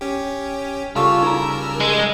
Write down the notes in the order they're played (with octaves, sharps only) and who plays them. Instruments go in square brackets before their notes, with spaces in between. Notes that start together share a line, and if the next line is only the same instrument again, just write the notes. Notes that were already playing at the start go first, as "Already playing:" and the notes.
[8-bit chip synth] C#4 G4
[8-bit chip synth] C#3 G3 E6 [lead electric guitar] F4 [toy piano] G4 A4 A5
[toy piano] D#4 A#5 [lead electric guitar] A#4
[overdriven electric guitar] G#3